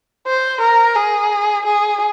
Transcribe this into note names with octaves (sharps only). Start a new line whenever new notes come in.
C5
A#4
G#4
G#4